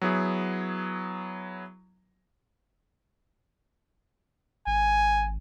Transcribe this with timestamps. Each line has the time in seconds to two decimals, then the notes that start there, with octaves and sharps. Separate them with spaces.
0.02 F#3 B3 E4 G#4
4.67 G#1 G#5